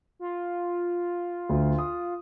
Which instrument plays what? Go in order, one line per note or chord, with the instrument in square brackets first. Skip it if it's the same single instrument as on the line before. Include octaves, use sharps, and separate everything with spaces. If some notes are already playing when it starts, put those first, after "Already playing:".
[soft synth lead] F4
[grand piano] D2
D#6